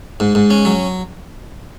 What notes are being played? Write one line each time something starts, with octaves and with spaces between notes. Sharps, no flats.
G#2
G#2
C#4
F#3